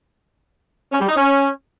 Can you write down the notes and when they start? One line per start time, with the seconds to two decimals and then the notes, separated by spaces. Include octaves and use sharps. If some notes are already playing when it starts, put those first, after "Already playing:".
0.92 C#4
1.00 G3
1.08 D#4
1.16 C#4